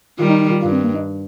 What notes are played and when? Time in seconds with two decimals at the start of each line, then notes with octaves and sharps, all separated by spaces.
0.19 D#3 G3 F4
0.29 D#4
0.40 D#4
0.51 F4
0.62 G2 F4
0.72 C4
0.84 A#3
0.94 D#4